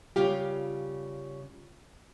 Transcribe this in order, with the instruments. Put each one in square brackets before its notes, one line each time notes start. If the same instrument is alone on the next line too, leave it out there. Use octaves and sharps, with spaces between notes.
[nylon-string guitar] C#3 G3 F4 G4